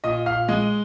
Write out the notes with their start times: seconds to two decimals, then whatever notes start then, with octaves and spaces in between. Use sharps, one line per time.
0.04 A#2 D#5 D#6
0.26 A#2 F5 F6
0.48 G#3 D#5 D#6